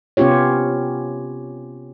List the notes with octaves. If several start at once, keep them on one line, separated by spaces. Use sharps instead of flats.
C3 B3 C#4 F4 G4 C#5